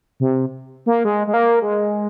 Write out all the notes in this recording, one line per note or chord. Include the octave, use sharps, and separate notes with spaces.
C3
A#3
G#3
G#3
A#3
G#3